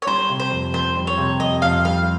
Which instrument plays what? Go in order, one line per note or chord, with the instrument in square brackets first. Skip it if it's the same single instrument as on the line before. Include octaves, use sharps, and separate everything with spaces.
[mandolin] C#5
[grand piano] G3 [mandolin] C5
[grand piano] C3
[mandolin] C5
[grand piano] F2
[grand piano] F2 [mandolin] C5
[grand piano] G3
[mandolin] C#5
[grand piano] C3
[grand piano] F2 [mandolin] D#5
[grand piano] F2 [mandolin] F5
[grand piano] G3 [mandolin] F5